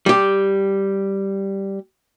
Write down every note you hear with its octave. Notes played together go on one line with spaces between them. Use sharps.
G3 G4